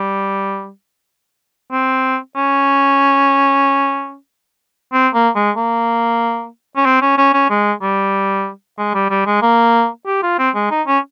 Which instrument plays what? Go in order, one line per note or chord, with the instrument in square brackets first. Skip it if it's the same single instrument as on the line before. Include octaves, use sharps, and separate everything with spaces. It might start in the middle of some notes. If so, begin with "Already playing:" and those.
Already playing: [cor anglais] G3
C4
C#4
C4
A#3
G#3
A#3
C#4
C4
C#4
C#4
C#4
G#3
G3
G#3
G3
G3
G#3
A#3
G4
F4
C4
G#3
D#4
C#4